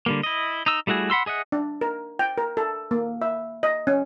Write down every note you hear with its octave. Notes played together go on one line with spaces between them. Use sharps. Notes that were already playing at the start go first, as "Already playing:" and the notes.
D3 G3 A#3
E4 D#5
D#4 E6
G3 A3 E4 F#4 G#4
F#5 B5 C6 E6
G#4 D#5 E5 F#5
D4
A#4
G5
A#4
A4
A#3
E5
D#5
C#4